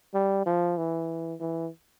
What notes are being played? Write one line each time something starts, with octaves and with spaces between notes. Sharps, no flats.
G3
F3
E3
E3